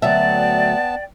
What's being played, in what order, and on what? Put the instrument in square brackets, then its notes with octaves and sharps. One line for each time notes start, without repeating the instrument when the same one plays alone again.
[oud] D2 F#3 E5 [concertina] B3 A5 [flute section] D5 G5